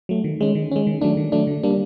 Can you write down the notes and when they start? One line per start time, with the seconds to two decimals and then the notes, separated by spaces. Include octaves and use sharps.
0.09 F#3 A3
0.24 D#3
0.41 G#3 C#4
0.55 D#3
0.71 G#3 C#4
0.87 D#3
1.01 F#3 A3 D4
1.17 D#3
1.32 F#3 A3 D4
1.47 D3
1.63 G3 A#3 D4